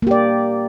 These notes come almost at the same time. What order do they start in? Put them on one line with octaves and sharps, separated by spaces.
A#3 G4 D5